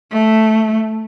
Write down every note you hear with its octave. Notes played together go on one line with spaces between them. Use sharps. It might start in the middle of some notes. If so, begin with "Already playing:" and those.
A3